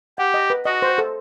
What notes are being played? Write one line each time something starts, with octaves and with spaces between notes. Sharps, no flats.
G4 F#5
D#5
B4
F#4 D#5
C5
A4